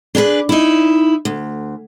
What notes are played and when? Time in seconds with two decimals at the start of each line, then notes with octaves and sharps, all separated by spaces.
0.15 D4 G#4 A#4 B4
0.49 D#4 E4
1.25 D2